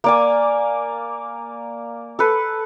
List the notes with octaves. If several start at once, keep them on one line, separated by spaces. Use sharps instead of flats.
A#3 D5 G#5
A4 B4